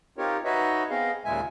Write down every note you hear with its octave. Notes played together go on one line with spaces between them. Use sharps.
C4 D#4 F4 G4 A#4 C#5
D#4 F#4 B4 C#5 D#5 E5
B3 C4 G#4 D#5 F5
D#2 A#2 C#3 G#3 E5 G#5